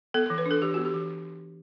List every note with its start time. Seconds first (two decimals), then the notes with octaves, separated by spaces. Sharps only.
0.14 B3 A4
0.26 E3 A4
0.38 B4
0.46 D4 A4
0.62 E3 G4
0.74 B3 F#4
0.85 G4
0.94 E3